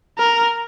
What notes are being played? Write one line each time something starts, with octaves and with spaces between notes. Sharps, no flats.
A#4